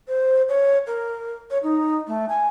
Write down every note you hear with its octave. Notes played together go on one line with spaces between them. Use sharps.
C5
C#5
A#4
C#5
D#4
A3
G#5